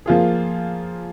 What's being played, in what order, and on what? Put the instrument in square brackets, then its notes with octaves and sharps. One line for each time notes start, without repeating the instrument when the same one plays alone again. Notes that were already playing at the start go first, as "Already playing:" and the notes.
[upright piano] F3 A#3 F4 G#4